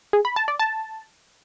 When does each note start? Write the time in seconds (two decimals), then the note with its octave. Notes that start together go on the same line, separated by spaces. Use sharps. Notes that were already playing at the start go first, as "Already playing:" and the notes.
0.13 G#4
0.25 B5
0.36 A5
0.48 D5
0.60 A5